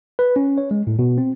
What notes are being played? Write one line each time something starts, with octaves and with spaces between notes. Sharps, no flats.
B4
C#4
C#5
G#3
A2
B2
C4